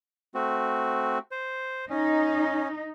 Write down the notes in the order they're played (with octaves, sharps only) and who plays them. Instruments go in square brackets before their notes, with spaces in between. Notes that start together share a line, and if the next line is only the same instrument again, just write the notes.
[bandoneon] A3 C4 F#4
C5
[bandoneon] C#4 [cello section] D#4